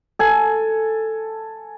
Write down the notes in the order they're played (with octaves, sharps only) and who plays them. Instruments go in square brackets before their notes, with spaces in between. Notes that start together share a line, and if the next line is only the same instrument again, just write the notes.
[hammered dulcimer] A4 G#5